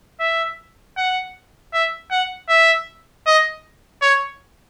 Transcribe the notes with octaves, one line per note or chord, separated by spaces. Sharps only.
E5
F#5
E5
F#5
E5
D#5
C#5